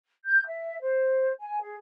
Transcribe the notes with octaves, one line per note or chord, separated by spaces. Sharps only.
G6
E5
C5
G#5
G#4